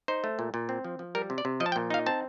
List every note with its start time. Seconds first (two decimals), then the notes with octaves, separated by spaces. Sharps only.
0.08 D#4 C5
0.24 A3
0.39 A#2
0.54 A#2
0.69 C4
0.84 F3
0.99 F3
1.15 G3 A#4
1.30 C3
1.38 D5
1.45 C3
1.60 F3 D#5
1.66 A5
1.72 G5
1.76 A#2
1.90 D#4 F5
2.06 C4 A5